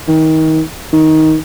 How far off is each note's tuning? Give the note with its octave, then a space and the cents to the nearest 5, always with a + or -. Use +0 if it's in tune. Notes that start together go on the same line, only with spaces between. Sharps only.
D#3 +30
D#3 +15